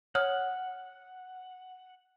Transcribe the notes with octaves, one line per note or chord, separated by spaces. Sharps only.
C#5 F#5 D#6 F6